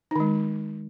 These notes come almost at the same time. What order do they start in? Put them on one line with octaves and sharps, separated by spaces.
D#4 D#3 G#3